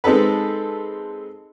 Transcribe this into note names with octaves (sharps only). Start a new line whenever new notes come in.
G#3 C4 D#4 A4 B4